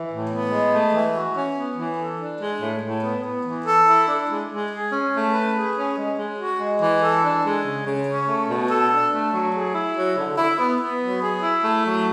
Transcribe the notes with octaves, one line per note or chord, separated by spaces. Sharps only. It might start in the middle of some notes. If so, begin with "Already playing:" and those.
Already playing: E3
A2
B3
G#3
A3
E3
F#4
C#4
B3
E3
A4
D4
G#3
A2
A2
B3
B3
E3
A4
E4
D4
G#3
G#3
G#4
C#4
A3
B4
G#4
C#4
G#3
G#3
F#4
G#3
E3
A4
D4
G#3
C#3
C#3
C#4
A3
B2
A4
D4
A3
F#3
G#4
E4
F#3
D3
E4
B3
B3
F#3
G#4
E4
A3
F#3